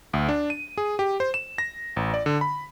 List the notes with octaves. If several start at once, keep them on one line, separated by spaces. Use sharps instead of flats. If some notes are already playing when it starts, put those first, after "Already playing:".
D2
D4
D#7
G#4
G4
C5
E7
A#6
A1
D5
D3
B5